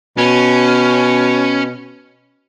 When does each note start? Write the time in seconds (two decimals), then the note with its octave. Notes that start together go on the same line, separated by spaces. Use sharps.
0.18 B2 C#4